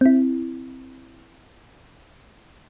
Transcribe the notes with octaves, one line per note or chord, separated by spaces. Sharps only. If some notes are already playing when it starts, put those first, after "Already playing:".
C4 E4